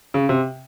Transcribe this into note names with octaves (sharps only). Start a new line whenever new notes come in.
C#3
C3